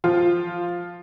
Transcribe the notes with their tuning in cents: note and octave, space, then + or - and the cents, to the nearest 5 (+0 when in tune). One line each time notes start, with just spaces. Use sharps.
F3 +0 F4 +0